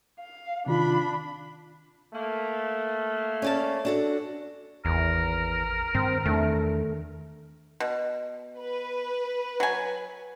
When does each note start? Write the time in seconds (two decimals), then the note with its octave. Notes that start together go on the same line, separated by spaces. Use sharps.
0.19 F5
0.66 C3 D#3 D4 F4 B5
2.13 A3 A#3
3.42 C#4 D5 A5
3.85 D4 F#4 A4
4.85 G#1 E2 A#4
5.95 G2 D#3 C4
6.25 E2 D#3 A3 D4
7.80 B2
8.59 B4
9.60 F#3 G#5